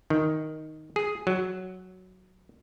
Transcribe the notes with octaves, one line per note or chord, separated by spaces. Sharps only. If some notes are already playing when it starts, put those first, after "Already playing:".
D#3
G#4
F#3